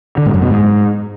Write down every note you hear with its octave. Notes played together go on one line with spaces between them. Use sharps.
D3
G#2
F#2
B2
G#2